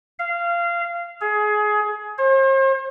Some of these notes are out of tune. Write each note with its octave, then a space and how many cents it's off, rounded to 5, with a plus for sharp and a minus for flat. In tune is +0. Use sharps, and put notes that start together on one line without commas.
F5 -20
G#4 +20
C5 +40